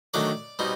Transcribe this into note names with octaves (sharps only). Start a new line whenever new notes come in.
D#3 F#3 A3 D4 D5 D6
B2 G3 C4 D#4